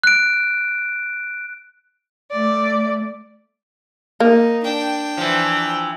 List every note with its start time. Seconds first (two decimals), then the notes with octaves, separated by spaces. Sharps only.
0.04 F#6 D7
2.31 A3 D5
4.20 A#3 D#4
4.64 D4 G5
5.18 E3 F3